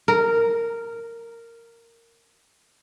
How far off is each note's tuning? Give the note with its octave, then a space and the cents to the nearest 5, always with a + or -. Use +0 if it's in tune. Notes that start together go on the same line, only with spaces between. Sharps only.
A#4 -10